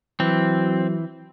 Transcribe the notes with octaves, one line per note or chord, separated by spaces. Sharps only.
E3 F#3 C4